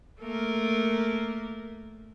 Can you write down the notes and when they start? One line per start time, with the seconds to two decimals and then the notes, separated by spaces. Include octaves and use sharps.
0.20 A3 A#3 A#4